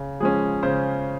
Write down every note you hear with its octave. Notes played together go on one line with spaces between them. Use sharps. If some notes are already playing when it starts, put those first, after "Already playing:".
Already playing: C#3
F3 G#3 C#4 G#4
C#3 C5